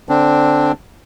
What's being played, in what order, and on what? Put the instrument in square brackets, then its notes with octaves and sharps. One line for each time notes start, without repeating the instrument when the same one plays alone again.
[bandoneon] D3 C4 D4